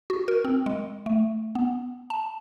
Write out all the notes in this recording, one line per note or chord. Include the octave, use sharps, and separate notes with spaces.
F#4
A#4
C4
G#3
A3
B3
A5